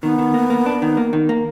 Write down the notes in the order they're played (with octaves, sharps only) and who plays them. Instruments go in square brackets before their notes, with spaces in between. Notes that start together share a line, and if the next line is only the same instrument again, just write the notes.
[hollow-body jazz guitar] D#3 [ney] B3
[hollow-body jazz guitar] D#3
A#3
A#3
D4
D#3
A#3
D#3
A#3